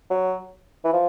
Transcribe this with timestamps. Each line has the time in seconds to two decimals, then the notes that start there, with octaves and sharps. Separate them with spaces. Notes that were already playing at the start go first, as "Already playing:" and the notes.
0.10 F#3
0.84 E3
0.93 F3